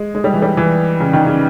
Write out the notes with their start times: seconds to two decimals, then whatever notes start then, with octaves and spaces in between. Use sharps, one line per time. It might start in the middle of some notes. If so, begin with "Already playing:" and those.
Already playing: G#3
0.15 G#3
0.24 G3
0.33 E3
0.42 G3
0.57 E3
1.00 C#3
1.13 D#3
1.26 C#3